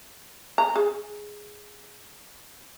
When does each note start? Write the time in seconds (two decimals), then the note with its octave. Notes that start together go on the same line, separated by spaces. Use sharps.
0.58 A#5
0.76 G#4